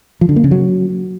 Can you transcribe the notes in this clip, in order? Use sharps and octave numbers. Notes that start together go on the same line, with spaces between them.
F3
D3
A#3
C#3
F#3